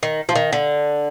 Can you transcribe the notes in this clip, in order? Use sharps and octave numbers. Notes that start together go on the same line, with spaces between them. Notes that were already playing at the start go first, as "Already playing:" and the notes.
D#3
F3
D#3
D3